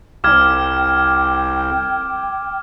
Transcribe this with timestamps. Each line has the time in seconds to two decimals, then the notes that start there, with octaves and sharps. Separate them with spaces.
0.24 C2 G5 D6 F6 G#6